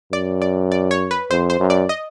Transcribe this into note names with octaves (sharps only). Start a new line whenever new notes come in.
F#2 D5
D5
D5
C#5
B4
F2 C5
C5
F#2
D5
D#5